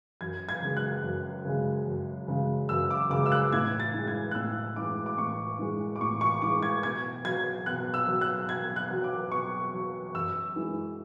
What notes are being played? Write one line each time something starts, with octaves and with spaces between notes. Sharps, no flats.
F#2 G#6
G#6
C#3 G#3
F#6
F#2
C#3 G#3
F#2
C#3 G#3
F#2 E6
D6
C#3 G#3 D6
E6
F#6
A2 G#6
A6
E3 G#3
G#6
F#6
A2 E6
E3 G#3 D6
D6
A2 C#6
E3 G#3
D6
A2 C#6
C#6
E3 G#3 D6
G#6
B2 G#6
F#3 G#6
B2 F#6
E6
F#3
F#6
B2 G#6
F#6
F#3
D6
B2 C#6
F#3
F#2 E6
E3 G#3